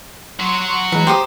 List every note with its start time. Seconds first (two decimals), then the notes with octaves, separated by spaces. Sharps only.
0.40 F#3 F#4 C6
0.92 E3 G#3 B4 A#5
1.07 G4 C5 C6 D#6